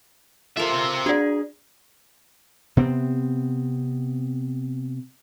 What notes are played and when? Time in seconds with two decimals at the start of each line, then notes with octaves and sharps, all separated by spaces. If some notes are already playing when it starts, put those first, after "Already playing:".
0.57 C4 F4 A4 A#4 E5
1.06 D4 G#4 D5
2.77 C3 B3 C4